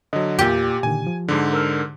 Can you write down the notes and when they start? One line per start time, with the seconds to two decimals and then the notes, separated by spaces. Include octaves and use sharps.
0.13 D3 F#3 D#5
0.39 E2 A#2 G4 D6
0.83 A#2 D3 D#3 G#5
1.07 F3
1.28 G#2 D3
1.53 A#4 E6 F6